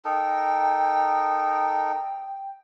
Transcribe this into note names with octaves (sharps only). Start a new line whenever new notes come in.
D#4 A4 A#4 G5